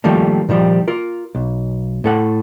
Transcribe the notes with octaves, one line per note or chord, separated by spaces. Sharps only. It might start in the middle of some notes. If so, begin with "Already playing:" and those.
D#3 F3 G3 A3 A#3
A#2 D#3 F3 G3
F4 A#4
B1
A2 A4 F#5